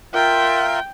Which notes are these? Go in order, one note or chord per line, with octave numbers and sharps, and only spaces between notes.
F4 A#4 E5 G5